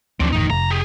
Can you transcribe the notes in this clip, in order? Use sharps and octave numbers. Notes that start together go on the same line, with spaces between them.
D2 F3 C4 D4
G1 E2 A2 D#3 D#4
F1 A#5
G4 G#4